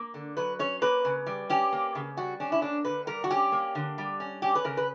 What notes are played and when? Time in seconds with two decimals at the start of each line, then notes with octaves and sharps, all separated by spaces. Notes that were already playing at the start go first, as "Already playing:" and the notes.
Already playing: A#3
0.14 D3
0.37 F#3 B4
0.59 C#4 C#5
0.82 A#3 B4
1.05 C#3
1.26 G3
1.50 C#4 G4
1.73 A#3
1.95 C#3
2.17 G3 F#4
2.40 C#4 D4
2.52 E4
2.62 A#3 D4
2.85 D3 B4
3.07 G3 A#4
3.24 F#4
3.30 C#4 G4
3.52 A#3
3.75 D3
3.98 G3
4.20 C#4
4.42 C#4 G4
4.55 B4
4.64 C#3 A#4
4.77 B4